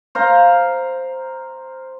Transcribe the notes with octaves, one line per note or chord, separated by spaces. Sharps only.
C5 F5 A#5